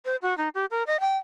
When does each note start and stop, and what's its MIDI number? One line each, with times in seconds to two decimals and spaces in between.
0.05 0.16 72
0.22 0.36 66
0.38 0.49 63
0.55 0.66 67
0.71 0.83 70
0.87 1.00 75
1.00 1.16 79